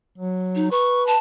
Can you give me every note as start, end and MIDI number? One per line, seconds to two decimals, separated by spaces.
0.18 0.70 54
0.56 0.71 63
0.71 1.14 71
0.71 1.05 85
1.07 1.18 81